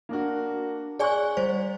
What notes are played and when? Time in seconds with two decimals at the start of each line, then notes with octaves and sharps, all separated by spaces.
0.09 A#3 D4 F#4
0.99 G#4 C#5 D5 G#5 C#6 F#6
1.37 G3 C5